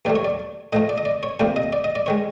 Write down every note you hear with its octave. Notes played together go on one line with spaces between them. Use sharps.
D#2 D#3 F#3 A3 D5
C#5
D5
A2 F3 A3 D#5
D5
D#5
D5
C#5
D2 C3 F3 A#3 D5
D#5
D5
D#5
D5
D#3 G#3 C#5